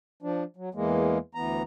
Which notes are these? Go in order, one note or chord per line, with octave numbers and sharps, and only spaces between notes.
F3 D4
F#3
E2 E3 G#3 A#3
D2 E3 B3 A#5